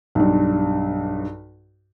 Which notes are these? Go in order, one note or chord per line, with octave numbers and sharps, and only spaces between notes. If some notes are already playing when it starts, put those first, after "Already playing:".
B1 G2